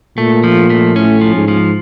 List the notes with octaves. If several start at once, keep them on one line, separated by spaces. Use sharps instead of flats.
A#2 A3
F3
A3
A2 C#4
F3
G#2
F3